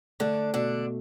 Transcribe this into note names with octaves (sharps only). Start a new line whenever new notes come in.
D3 A3 D4
B2 D3 D4